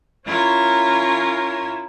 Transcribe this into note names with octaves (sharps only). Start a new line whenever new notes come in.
C#4 E4 F4 A#4 C#5